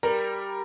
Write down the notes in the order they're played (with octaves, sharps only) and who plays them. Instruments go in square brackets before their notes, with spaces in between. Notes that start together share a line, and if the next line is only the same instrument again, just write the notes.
[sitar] G3 [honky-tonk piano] A#4